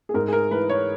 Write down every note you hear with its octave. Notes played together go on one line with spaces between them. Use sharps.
G#4
G#2 A#4
G#4
A#4
E3 B4
C#5